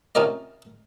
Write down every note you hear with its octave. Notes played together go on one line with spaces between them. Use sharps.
C3 C#4 F4 A#4 D5 D#5